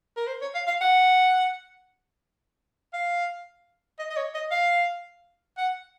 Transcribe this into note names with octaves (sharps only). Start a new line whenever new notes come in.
A#4
C5
C#5
F5
F5
F#5
F5
D#5
D#5
C#5
D#5
F5
F#5